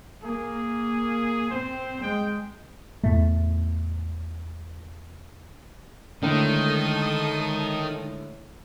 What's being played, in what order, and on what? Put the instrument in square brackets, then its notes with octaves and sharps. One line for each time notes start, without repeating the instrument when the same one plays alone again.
[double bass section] A#3 [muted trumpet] G#4
[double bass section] C4 [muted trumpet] C5
[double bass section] G#3 [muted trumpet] G5
[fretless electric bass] E2 A2 A3
[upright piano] A2 D3 [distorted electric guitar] D#3 [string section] G#3 A4 D#6